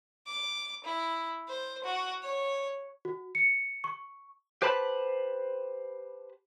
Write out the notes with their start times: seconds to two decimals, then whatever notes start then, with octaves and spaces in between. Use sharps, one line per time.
0.27 D6
0.84 E4
1.49 C5
1.84 F#4
2.23 C#5
3.05 F#4
3.35 C#7
3.84 C#6
4.62 G4 B4 C5 A5 B5